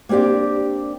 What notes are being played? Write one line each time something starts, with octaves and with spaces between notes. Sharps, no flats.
A#3 C4 D4 G4 D5